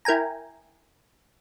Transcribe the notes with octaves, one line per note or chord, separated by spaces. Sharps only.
E4 A#4 G5 G#5 A#5